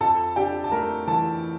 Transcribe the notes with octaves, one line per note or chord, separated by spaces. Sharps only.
F2 A4 A5
D4 G4 G5
A5
A3 A#4 A#5
E3 A4 A5